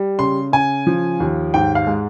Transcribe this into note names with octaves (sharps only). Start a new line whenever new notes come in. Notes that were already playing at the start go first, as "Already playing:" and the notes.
Already playing: G3
C#3 C6
C#3 G#5
F3
D#2
G#2 G5
F5
G#3